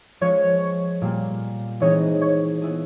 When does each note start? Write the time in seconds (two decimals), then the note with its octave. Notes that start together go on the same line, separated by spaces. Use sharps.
0.21 F3 G#3 C#4 C#5
1.01 A#2 G3 A#3
1.80 E3 G#3 C4 D#4 G#4 C#5
2.21 C#5
2.62 B3 E4 G#4